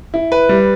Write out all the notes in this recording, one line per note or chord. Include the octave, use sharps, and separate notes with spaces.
E4
B4
G3